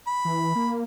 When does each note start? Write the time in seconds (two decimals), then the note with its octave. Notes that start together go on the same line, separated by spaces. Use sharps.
0.07 B5
0.25 E3
0.55 A#3